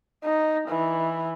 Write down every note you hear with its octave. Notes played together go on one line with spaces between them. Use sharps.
D#4
E3